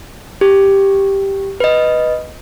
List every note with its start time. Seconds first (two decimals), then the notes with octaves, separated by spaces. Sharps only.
0.41 G4
1.60 B4 D#5